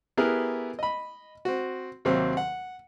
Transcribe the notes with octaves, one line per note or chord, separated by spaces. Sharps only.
B3 E4 G4 G#4 A#4 B4
D#5 B5
C4 F#4
D#2 C3 F#3 C4
F#5